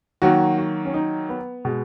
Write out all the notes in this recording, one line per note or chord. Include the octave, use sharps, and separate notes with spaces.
D#3 F#3 A#3 F#4
F#4
C#4
D#4
B3
B2 G#3